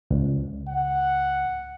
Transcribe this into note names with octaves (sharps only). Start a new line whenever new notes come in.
C#2
F#5